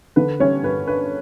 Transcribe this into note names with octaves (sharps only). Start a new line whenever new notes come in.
D3 B4
G3 C#4 C#5
G2 B4
D4 B4